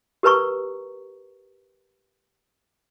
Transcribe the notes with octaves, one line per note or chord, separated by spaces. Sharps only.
G4 A#4 B4 A#5 C#6